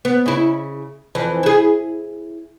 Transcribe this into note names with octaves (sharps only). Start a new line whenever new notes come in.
B3
C#3 E4
F2 E3
E4 G#4